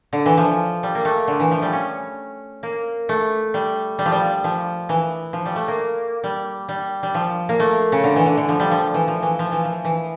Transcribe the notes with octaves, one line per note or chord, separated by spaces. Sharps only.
D3
E3
F3
G3
A#3
A3
D3
E3
F3
G3
C#4
A#3
A3
G3
G3
F3
G3
F3
E3
F3
G3
A3
A#3
G3
G3
G3
F3
A#3
A3
C#3
D3
E3
D3
D3
F3
G3
F3
E3
F3
E3
F3
E3
F3
E3